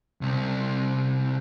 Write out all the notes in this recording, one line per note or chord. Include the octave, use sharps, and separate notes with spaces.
C2